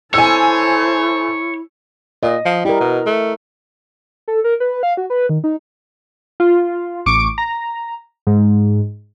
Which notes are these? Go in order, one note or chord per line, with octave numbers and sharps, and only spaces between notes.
E4 A4 C5 C#5 G#5 E6
A#2 D#5
F3
G3 E4 A#4
B2
A3
A4
A#4
B4
F5
F#4
B4
D#3
D#4
F4
A1 C#6 D6 D7
A#5
G#2